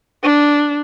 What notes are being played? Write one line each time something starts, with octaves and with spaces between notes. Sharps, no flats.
D4